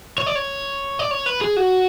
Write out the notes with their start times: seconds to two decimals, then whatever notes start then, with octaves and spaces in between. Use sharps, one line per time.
0.18 C#5
0.26 D5
0.35 C#5
0.99 D5
1.11 C#5
1.26 B4
1.41 G#4
1.57 F#4